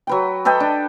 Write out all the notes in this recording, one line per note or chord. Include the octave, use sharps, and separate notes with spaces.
F#3 B4 G5
A4 B4 D#5 G5
D4